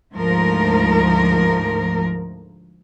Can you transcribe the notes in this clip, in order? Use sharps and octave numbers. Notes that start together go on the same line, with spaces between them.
D2 G#2 F3 A3 A#4